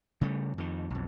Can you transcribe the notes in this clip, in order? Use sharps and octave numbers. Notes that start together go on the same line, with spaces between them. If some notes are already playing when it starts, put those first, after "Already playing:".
C#3 G3 A3
F2 D#3
B1 F2